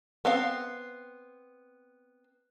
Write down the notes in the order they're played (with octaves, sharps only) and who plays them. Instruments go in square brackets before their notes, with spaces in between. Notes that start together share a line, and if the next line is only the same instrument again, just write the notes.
[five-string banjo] B3 C4 F5